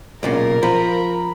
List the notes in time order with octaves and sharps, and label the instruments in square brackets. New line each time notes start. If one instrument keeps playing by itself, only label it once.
[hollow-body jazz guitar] B1 A#2 C#3 [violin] A#4
[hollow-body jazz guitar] F3 [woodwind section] A#5 B5